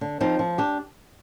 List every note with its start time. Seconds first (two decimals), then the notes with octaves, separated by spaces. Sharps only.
0.01 D3
0.21 F3 C4 D#4
0.39 F3
0.58 D4 G4